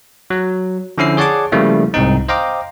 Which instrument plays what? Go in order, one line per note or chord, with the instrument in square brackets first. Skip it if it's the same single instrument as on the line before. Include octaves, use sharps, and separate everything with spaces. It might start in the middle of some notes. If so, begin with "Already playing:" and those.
[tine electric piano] F#3
D3 F3 C#4 E4 E6 C7
G#4 C#5 D5 F#5 A5 D6
C#3 F3 G3 A3 A#3 E4
C2 G#2 C4 D#4
C5 D#5 F5 G5 A#5 D6